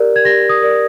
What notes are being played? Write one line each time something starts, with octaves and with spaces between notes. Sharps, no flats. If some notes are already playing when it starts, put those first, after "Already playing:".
Already playing: G4 A#4 D5
G#6
G4 A#6
D#6
A#4 D5